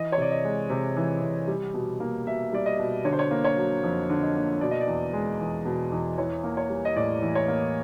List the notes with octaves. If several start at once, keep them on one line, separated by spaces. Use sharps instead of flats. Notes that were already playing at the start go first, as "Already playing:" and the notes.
Already playing: E3 D#5
C#5
C3 D5
D#5
G#3
C3
E3
C3
G3
B2
A#3
B2 E5
G3 D5
D#5
B2
D3 C#5
C5
C#5
A#3
C#5
F#3
F2
D3
D#5
A#3
B2 D5
D#5
D5
E2
G#3
E2
B2
E2
E3 C#5
A#3
C#5
G3
D#5
A2 D5
E3
C#5
A#3